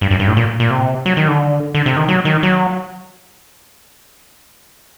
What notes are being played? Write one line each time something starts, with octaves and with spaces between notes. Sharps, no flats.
G2
F#2
G2
A2
A#2
A#2
C3
F#3
D#3
D3
D3
C3
D#3
F#3
D#3
F#3